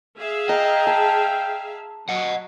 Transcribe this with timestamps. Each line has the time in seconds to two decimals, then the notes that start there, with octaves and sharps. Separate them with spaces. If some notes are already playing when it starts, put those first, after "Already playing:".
0.19 G#4 E5 F5
0.49 D#5 G5 A#5
0.87 A5
2.09 F#3 D#5 F#5